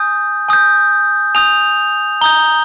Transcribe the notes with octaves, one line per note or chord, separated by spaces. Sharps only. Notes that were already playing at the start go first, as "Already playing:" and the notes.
Already playing: G#5 D#6 G6
G#5 D#6 G6
G#5 D#6 G6 F7
A#5 D#6 G6 G7